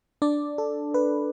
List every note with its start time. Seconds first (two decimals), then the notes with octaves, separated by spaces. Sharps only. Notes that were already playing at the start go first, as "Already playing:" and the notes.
0.22 D4 D5
0.58 A4
0.94 B4